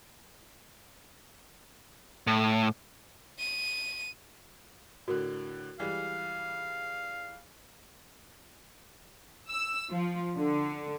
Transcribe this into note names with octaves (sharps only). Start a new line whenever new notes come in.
A2
D#7
A2 D3 F#4 A#4
E3 G3 G#3 F5
E6
F3
D3